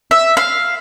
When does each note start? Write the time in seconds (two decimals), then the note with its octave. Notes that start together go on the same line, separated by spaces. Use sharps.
0.11 E5
0.37 F5